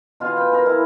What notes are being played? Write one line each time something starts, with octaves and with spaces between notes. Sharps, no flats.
B2 F4 F5 G#5
B4 G5
F4 G#4 A#4
E4 A5